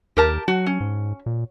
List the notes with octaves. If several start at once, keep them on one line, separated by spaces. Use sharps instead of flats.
D#2 G4 A#4 A5
F#3 F#4
C#4
G#2
A#2